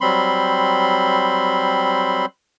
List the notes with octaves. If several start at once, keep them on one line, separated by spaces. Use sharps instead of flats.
F#3 G3 C4 B5 C6